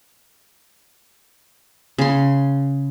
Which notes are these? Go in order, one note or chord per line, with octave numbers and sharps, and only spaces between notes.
C#3 C6